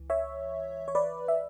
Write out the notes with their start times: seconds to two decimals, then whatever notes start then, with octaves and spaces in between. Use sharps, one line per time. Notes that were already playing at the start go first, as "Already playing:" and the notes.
Already playing: C#2 E3
0.10 C#5 E5
0.88 C#5
0.95 B4 D5
1.28 E5